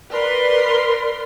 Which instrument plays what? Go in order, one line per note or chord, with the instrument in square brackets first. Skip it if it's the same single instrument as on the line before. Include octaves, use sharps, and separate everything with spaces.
[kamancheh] A#4 C6 [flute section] B4 D5